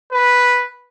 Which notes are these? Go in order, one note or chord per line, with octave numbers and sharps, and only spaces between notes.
B4